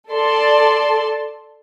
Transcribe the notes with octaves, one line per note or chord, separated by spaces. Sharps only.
A4 D5 A5 C6